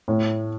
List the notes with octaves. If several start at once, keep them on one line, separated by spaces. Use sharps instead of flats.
A2